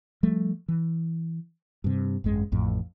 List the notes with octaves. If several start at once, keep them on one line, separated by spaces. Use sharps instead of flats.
F3 G3 A3
E3
G2 C3
G#1 F#2 G#3
A1 F2 A2